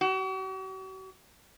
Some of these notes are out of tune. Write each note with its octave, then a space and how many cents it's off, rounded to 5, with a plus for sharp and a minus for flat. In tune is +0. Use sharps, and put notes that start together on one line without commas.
F#4 +45